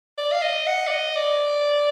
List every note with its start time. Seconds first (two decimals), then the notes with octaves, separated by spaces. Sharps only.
0.18 D5
0.32 F5
0.42 D#5
0.67 F#5
0.87 D5
0.91 D#5
1.16 D5